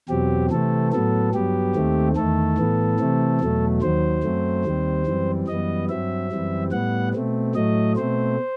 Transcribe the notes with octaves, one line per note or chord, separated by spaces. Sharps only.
E2 B2 F#3 C4 G4
C3 E3 A3 C4 A4
A2 F#3 B3 A4
G2 F#3 B3 G4
D#2 D#3 A3 C4
E2 D#3 A3 A4
A2 E3 B3
C3 E3 A3 C4
E2 B2 F#3 A3
D#2 D#3 F#3 C5
F#2 F#3 A3 C4
D#2 D#3 G3 C4
F#2 E3 G3 C4
F#2 E3 G3 B3 D#5
G2 F#3 C4 E5
F#2 E3 G3 C4
A2 G3 B3 F#5
B2 A3 C4
A2 F#3 A3 D#5
B2 A3 C4 C5